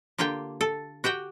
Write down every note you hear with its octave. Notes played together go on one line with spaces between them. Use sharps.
D3 A#3 F4 G4 G5
A4
F#4 G4 F#5 G5